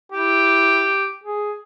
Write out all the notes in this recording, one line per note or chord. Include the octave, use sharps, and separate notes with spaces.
E4 G4
G#4